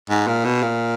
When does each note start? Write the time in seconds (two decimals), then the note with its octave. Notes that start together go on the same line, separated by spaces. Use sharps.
0.10 G#2
0.27 A#2
0.45 B2
0.63 A#2